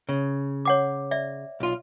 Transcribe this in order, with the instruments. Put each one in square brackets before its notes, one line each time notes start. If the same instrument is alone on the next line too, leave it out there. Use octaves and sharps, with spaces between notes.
[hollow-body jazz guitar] C#3
[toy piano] C#5 F#5 D6
D5 E5
[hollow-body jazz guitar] B1 F4